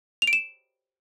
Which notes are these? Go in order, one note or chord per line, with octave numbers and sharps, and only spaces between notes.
F7
D7
E7